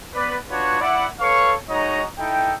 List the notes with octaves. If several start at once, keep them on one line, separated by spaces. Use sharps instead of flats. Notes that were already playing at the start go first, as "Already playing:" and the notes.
B3 B4 D5
D4 F4 F#4 B4 C#5
E4 D5 F#5
A4 B4 C#5 F5 C#6
G#3 D#4 F#4 C#5 D#5 A#5
D#4 E4 A4 G5